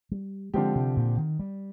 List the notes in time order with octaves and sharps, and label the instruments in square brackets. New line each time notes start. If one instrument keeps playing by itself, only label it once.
[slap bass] G3
[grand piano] D3 F3 C4 G4 [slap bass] G#3
[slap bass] C3
A#2
D#3
G3